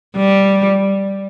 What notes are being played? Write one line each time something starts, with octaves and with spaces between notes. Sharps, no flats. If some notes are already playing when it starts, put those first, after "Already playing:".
G3